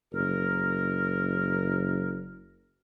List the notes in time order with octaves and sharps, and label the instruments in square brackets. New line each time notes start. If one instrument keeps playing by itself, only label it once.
[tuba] F#1 [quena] A#4